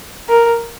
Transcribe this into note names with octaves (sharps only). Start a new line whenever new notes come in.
A#4